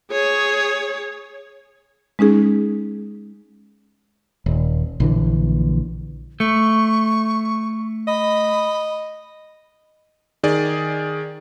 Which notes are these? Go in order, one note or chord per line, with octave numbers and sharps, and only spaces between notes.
G#4 C#5
G#3 C#4 D#4 G#4
D#1
A#1 D3 E3
A3 C#6
D#5 B5
D#3 G#4 D5